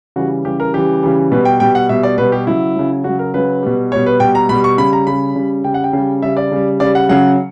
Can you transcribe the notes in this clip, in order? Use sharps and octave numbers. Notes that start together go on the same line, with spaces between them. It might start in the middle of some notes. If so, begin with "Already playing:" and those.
C#3 E3 G3 F#4
C#3 E3 G3 G4
A#4
C#3 E3 G3 G4
C#3 E3 G3
B2 G3 B4
G5
B2 G3 G5
F#5
B2 G3 E5
D5
B2 G3 B4
G4
C#3 F#3 E4
C#3 F#3
C#3 F#3 F#4
A#4
C#3 F#3 B4
B2 G3
B2 G3 C#5
B4
B2 G3 G5
A#5
B2 B5
G3
C#6
C#3 G3 B5
A#5
C#3 G3 B5
C#3 G3
C#3 G3 G5
F#5
G5
C#3 G3
C#3 G3 E5
D5
C#3 G3
C#3 G3 D5
F#5
C#3 F#3 F#5